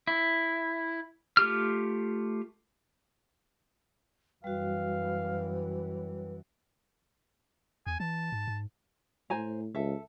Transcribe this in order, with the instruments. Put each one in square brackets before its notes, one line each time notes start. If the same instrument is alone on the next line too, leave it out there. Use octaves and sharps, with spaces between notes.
[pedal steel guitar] E4
A3 F4 G4 F6
[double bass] F#2 E3 [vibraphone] G3 F#4 [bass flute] B4 [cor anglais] F5
[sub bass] E2 [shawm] G#5
[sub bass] E3 [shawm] A5
[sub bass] G#2
G#2
[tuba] A2 [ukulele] C5 G#5 A#5
[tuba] C#2 [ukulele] A4 E5